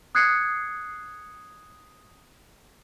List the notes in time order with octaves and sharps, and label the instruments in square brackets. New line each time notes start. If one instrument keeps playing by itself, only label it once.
[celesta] D#6 F#6 G#6 C7 C#7